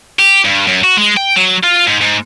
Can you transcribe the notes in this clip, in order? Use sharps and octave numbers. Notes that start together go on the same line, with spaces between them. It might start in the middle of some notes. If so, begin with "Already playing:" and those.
G4
G2
F#2
F#4
G#3
G5
F#3
F4
G#2
G#2